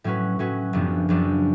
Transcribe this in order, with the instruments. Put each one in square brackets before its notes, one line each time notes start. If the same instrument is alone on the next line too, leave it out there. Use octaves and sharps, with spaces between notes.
[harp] A2 F#3 C#4 F#4 B4
A2 F#3 C#4 F#4 B4
F#1 F#2 F3 B3 D4
F#1 F#2 F3 B3 D4